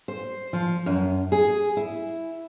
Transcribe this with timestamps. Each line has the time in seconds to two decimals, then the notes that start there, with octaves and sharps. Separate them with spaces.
0.08 C5
0.53 F3
0.86 F#2
1.32 G#4
1.77 E4